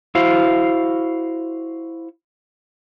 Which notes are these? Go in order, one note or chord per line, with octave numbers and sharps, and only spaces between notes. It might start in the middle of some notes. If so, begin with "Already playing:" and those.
E4 F#4 C5 F5